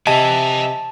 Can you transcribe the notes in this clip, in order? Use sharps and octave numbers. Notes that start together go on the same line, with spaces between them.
C3 D#5 E5 G#5 A5